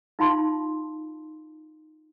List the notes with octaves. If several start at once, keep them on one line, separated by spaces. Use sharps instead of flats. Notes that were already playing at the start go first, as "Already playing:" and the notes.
D#4 F4 F5 A5 B5 C6